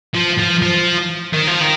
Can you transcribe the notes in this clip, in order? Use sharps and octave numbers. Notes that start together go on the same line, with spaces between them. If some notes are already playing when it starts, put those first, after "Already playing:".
F3
F3
F3
D#3
F3
D#3